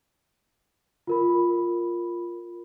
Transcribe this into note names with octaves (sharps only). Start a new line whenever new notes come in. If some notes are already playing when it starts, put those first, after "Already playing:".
F4 A#4 B5